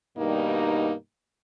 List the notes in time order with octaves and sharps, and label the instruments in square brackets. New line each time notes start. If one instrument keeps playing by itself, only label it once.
[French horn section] G2 B2 D#3 G3 A#3 D#4